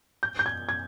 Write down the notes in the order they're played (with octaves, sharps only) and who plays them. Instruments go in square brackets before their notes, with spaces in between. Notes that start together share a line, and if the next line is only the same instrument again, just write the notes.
[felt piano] G6
G6
G#6
G#6